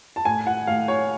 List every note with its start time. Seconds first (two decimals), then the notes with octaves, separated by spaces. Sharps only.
0.16 A5
0.25 A2 G#5
0.47 F#5
0.67 A2 F5
0.88 C#5